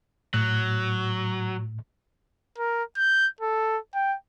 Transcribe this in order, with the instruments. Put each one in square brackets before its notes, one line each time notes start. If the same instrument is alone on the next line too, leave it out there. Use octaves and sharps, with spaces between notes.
[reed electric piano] A2 [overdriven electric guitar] F#3
[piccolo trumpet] A#4
G6
A4
G5